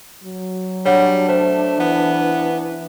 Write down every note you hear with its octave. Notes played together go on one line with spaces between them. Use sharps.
F#3
G3 D4 C#5 F#5
A3 C5
E3 B3